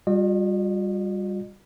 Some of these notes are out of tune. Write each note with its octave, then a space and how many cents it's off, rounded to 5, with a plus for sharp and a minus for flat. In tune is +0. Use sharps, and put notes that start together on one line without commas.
G3 +15 F4 +45 D#5 -35